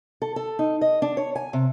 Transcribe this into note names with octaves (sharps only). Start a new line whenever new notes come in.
A4
A4
D#4
D#5
D4
C#5
G#5
C3